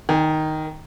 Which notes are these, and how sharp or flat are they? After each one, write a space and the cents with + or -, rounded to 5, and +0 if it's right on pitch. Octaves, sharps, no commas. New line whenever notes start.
D#3 +0 G#5 -45